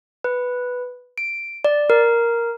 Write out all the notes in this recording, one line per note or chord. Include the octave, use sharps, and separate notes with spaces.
B4
D7
D5
A#4